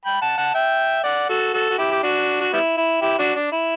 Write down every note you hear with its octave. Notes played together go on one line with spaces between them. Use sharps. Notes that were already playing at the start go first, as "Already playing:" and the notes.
G5 B5
F#5 A5
F#5 A5
E5 G5
D5 F#5
F#4 A4
F#4 A4
F#4
E4 G4
G4
D4 F#4
F#4
G3 B3 E4
E4
E4 G4
D4 F#4
D4
E4